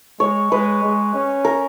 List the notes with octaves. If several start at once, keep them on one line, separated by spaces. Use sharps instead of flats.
G#3 C#5
G#3 B4
G#3
C#4
A#4